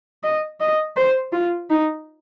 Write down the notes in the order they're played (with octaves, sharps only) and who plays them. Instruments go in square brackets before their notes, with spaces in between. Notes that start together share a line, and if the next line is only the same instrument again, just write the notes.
[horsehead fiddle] D#5
D#5
C5
F4
D#4